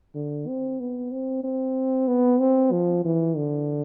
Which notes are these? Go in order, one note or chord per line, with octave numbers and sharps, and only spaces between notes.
D3
C4
B3
C4
C4
B3
C4
F3
E3
D3